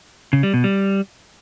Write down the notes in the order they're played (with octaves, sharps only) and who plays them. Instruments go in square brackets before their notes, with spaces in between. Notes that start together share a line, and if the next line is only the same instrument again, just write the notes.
[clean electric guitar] C#3
G3
B2
G3